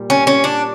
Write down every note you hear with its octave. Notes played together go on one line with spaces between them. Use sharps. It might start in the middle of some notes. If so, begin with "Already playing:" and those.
Already playing: A#2 G3
C#4
C#4
D4